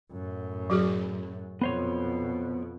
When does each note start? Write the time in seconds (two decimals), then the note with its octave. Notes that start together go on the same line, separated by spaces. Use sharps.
0.12 F#2 A2
0.70 F#3 F#4 G#4
1.61 F2 B2 B3 C5 C#5